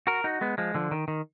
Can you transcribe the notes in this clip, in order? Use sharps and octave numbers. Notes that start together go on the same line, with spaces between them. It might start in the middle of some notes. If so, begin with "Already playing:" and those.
F#4 A#4
D#4 F#4
G#3 B3
F3 G#3
D3 F3
D#3
D#3